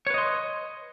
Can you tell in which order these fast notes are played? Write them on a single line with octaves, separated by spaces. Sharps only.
C#5 B4 D#5 C6